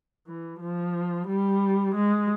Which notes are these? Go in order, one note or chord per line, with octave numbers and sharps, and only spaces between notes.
E3
F3
G3
G#3